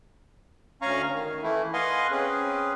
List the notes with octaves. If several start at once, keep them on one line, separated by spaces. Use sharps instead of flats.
D2 C#4 F5 G#5 A#5 C#6
D#3
E3 A3 E4
B4 D#5 F5 F#5 G#5 C6
C4 C#4 G#4 B4